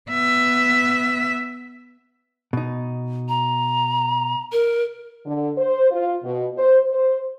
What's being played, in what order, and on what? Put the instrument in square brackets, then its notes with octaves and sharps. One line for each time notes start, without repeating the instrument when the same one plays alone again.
[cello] B3 E5
[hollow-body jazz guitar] B2 D#4
[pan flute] A#5
A#4
[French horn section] D3
C5
F4
B2
C5
C5